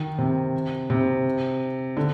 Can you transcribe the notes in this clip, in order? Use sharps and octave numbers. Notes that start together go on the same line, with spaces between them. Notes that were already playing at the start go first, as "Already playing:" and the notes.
Already playing: D#3
C3
C3
D3